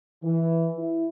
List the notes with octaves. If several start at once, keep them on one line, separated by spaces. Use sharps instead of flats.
E3
E4